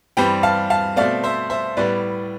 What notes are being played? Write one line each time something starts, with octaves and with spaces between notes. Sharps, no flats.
G2 E3 G3 C4 G5 B5
F5 A5
F5 A5
B2 A3 C4 D5 F5
C5 E5
C5 E5
A2 G3 B3 B4 D5